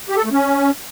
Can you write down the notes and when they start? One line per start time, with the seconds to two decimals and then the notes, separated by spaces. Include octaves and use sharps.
0.09 G4
0.17 A4
0.24 A3
0.32 C#4